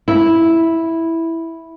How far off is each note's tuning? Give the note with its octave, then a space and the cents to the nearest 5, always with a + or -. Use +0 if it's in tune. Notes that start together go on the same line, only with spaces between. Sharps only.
E4 -5